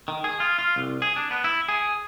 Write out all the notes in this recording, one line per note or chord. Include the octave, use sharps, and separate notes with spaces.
D#3
G#4
F4
F4
C2
G#4
D4
B3
E4
G#4